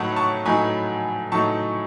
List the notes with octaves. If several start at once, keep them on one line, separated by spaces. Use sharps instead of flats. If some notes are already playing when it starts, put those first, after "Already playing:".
Already playing: A2 F#3 A3 D#4 C#5 F#5 A5 B5
A5 C#6
A2 F#3 A3 D#4 G#5 B5
A2 F#3 A3 D#4 A5 C#6